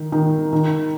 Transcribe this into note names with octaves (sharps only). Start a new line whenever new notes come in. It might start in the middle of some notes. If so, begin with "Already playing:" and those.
Already playing: D#3
D#3
D#3